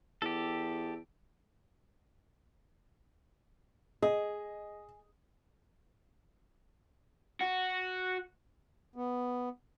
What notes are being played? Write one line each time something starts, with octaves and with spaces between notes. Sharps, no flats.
E2 G4 A4
G#4 D#5
F#4
B3